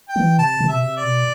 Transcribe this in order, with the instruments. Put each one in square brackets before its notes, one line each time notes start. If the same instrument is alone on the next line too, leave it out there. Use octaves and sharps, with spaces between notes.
[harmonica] G5
[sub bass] E3
[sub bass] C3 [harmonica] A5
[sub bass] C3
[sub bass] B2 [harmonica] E5
[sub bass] C3
[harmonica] D5
[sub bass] B2